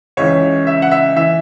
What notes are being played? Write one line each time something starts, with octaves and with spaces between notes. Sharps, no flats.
C#2 C#3 E3 C#5
E5
F#5
E5
E3 E5